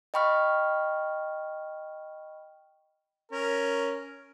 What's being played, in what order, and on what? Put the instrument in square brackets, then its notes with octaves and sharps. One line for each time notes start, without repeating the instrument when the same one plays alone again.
[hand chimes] D#5 G5 B5 C#6 F6
[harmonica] C#4 A#4